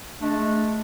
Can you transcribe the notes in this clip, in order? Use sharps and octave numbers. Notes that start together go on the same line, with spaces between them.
G#3 A3 D4